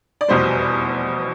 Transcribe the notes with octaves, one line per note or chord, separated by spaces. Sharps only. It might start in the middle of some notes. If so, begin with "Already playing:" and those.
D5
F1 E2 B2 G3 C5